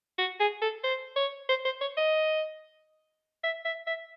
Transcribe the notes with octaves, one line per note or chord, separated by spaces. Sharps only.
F#4
G#4
A4
C5
C#5
C5
C5
C#5
D#5
E5
E5
E5